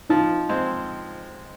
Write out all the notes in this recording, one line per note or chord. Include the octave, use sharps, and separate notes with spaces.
F3 D#4
G#3 C4